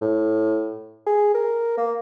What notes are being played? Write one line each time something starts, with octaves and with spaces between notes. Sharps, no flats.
A2
G#4
A#4
A#3